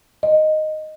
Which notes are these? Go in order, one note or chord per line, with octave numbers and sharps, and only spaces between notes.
D#5